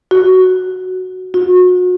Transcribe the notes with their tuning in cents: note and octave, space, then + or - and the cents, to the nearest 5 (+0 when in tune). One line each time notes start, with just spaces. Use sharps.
F#4 +0
F#4 -35